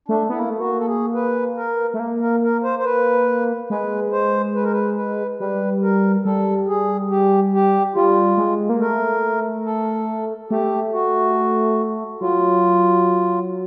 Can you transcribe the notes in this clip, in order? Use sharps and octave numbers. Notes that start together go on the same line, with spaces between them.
A3 D4
B3 E4
A#3
A3
A#3 F#4
A4
G#4
B4
A#4
A3
A#3
A#4
A#4
C5
C5
B4
G#3 B4
C5
B4
A#4
B4
B4
G3 B4
A#4
G3 A4
G#4
G4
G4
G3 F4
G#3
A#3
A3 A#4
A4
A3 G4
F#4
F#3 F4